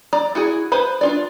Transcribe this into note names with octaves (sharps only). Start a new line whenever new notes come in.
D5 A#5
E4 F#4 G#4
B4 C5 B5
D4 F4 D5